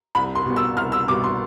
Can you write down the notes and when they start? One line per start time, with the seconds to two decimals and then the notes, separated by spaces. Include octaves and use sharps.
0.15 C2 B5
0.35 C6
0.46 B2 G3 B3
0.56 E6
0.77 C2 F6
0.92 E6
1.08 B2 G3 B3 D6
1.24 C6